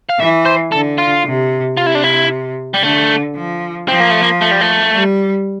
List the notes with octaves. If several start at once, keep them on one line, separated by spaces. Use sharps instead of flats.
F5
E3 E5
C5
D3 A4
F4
C3
C3 F4
E4
D4
E4
G3
D3 A3
F3
F3 C4
A#3
A3
A#3
A3
G3
A3
G3